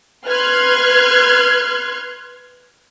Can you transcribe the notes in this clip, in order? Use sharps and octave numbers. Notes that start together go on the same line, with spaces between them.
B4 C6 F6 F#6 G#6